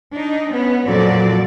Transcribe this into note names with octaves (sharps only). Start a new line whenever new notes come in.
D4 D#4
B3 C#4
F2 A#2 F#3 F#4 A4 D5